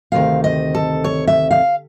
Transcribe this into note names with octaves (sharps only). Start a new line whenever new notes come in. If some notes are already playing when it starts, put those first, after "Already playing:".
D2 C3 D#3 F5
D#5
A4
C#5
E5
F5